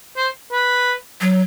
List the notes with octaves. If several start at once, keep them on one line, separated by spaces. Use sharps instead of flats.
C5
B4
F#3